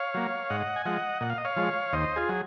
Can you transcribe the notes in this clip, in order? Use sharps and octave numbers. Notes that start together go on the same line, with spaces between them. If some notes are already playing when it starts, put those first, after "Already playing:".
Already playing: C#5 F5
F#3 A#3
G#2 D#5 F#5
G#5
F3 G#3 D#5 F#5
A#2 F#5
F5
D#5
C#5 F5
F3 G#3
D#2 C5 D#5
F4 G#4
F#3